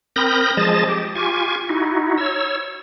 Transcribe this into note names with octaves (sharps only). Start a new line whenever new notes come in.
C4 A#4 B5 D#6 G6 A#6
F3 G#3 G#4 D#5 A5 A6
G4
F4 G4 G#5 C#6
D#4 E4 F#4
C#5 E6